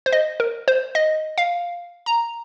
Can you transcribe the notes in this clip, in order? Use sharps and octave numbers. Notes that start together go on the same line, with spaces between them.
C5
D#5
A#4
C5
D#5
F5
A#5